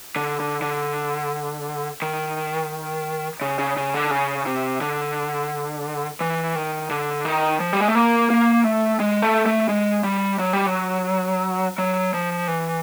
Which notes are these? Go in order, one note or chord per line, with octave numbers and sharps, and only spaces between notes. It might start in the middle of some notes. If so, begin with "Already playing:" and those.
D3
D3
D3
D#3
C#3
C#3
C#3
D3
C#3
C3
D3
E3
D#3
D3
D#3
F3
G3
G#3
A3
A#3
A#3
A3
G#3
A3
A3
G#3
G3
F#3
G3
F#3
F#3
F3
E3